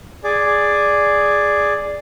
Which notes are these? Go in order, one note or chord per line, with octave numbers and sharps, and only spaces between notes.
G#4 D5